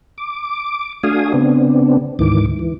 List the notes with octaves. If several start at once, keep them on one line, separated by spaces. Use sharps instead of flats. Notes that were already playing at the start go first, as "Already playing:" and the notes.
D6
A3 D4 F#4 F5 G#5 D#6
C#3 B3 C4 D4
D2 G#2 D#3 E3 D6
E3